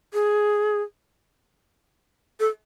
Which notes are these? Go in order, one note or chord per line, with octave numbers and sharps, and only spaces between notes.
G#4
A4